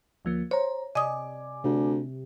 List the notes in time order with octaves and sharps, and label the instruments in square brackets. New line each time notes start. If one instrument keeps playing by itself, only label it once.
[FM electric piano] D2 F3 A#3
[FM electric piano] C5 A#5 [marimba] C#5
[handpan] C3 [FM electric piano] D5 G#5 D6 [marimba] D#5 D#6
[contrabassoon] D2 [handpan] C3